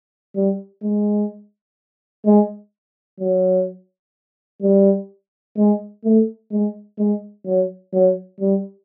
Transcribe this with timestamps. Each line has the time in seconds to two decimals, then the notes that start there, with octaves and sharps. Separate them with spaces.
0.36 G3
0.83 G#3
2.25 G#3
3.20 F#3
4.62 G3
5.57 G#3
6.04 A3
6.51 G#3
6.99 G#3
7.46 F#3
7.93 F#3
8.40 G3